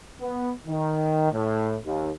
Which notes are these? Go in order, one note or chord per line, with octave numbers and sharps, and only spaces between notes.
B3
D#3
A2
D#2